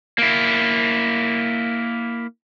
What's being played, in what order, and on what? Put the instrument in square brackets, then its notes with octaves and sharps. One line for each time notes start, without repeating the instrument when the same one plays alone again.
[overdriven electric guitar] A#3 E4